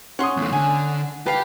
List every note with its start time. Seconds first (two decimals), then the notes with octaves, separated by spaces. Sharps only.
0.19 C#4 F#5 C6 C#6 D#6
0.37 E2 A3
0.52 D3 G#5
1.26 G4 B4 F5 A5